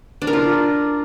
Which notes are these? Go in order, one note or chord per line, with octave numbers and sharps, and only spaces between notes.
D4
A#4
F4